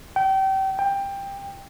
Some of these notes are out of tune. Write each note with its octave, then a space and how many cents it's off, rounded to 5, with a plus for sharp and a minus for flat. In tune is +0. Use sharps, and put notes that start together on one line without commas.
G5 -30
G5 +15